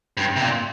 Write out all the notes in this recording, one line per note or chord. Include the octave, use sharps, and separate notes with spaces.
G2
C3
A#2